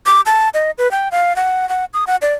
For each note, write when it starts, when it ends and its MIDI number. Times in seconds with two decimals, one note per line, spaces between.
0.06 0.21 86
0.26 0.49 81
0.54 0.71 75
0.78 0.91 71
0.91 1.09 79
1.12 1.35 77
1.36 1.69 78
1.69 1.85 78
1.94 2.04 87
2.07 2.16 78
2.22 2.34 74